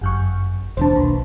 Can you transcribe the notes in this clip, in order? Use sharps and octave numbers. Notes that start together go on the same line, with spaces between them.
G1 F#2 C#6
E1 D#2 D4 C5 A5
B1